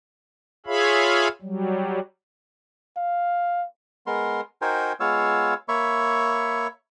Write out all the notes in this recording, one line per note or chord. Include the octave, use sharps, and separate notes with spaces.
F4 G#4 C#5 E5 F5 B5
F#3 G3
F5
G#3 B3 A#4 C6
D#4 F#4 A#4 C5 G5 G#5
G#3 B3 F4 C#5 F5 E6
A#3 C#5 E5 B5 C#6